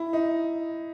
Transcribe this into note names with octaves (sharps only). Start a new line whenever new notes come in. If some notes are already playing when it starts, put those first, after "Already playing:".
Already playing: E4
D#4